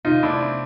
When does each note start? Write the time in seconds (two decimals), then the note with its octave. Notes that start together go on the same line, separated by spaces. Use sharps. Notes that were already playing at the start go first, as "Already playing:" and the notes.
0.05 C3 D#4 F4
0.22 A3 D4 E4
0.40 C4